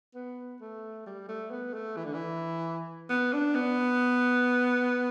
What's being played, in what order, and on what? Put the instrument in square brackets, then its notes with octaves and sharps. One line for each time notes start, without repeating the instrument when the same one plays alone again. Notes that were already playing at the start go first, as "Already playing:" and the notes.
[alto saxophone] B3
A3
G3
A3
B3
A3
E3
D3
E3
B3
D4
B3